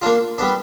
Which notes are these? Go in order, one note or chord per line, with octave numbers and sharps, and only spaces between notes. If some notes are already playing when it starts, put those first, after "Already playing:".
A#3 D4 F4
G3 B3 D4